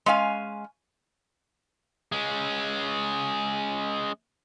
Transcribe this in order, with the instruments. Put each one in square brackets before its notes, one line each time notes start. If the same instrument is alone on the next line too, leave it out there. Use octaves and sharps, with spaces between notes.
[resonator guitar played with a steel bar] G#3 C#4 F5 G#5
[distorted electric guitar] G#3 C#4